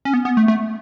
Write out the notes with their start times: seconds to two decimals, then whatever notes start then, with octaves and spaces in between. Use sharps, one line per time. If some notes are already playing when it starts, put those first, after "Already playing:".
0.05 C#4
0.14 B3
0.25 B3
0.37 A3
0.48 A3